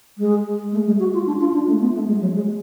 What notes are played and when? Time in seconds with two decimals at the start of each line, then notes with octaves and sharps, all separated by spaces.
0.18 G#3
0.72 A3
0.86 G#3
1.00 F#4
1.13 F4
1.26 D4
1.40 F4
1.54 D4
1.67 A3
1.81 B3
1.94 A3
2.07 G#3
2.21 F#3
2.35 G#3